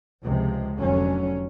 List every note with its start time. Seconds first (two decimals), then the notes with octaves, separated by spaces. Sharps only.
0.24 C#2 C3 F3 G#3
0.78 F1 D3 F#3 C#4